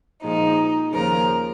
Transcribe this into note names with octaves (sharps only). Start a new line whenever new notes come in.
A#2 F3 G#3 D#4
D#2 C#3 F3 A#4